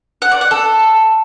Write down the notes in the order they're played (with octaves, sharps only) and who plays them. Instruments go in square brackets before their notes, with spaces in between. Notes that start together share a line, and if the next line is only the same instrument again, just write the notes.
[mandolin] F#5
D5
F#5
A4